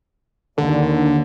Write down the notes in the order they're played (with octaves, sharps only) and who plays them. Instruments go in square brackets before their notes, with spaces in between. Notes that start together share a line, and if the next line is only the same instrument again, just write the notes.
[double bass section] D#2 [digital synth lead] D3